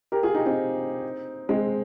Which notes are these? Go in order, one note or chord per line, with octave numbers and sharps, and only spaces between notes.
G4 A#4
F4 G#4
D#4 G4
C4 D#4
G#3 C4